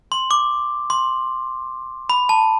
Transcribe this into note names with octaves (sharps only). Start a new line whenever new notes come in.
C6
D6
C6
B5
A5